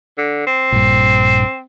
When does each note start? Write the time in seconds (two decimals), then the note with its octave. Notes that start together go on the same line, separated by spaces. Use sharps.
0.18 D3
0.47 C4
0.72 A#1 G2